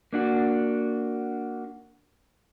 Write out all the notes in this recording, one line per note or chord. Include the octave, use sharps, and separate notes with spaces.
A#3 D4 F#4